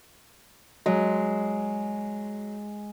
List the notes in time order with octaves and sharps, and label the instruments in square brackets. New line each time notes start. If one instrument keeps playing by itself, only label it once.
[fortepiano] F#3 [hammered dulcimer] G#3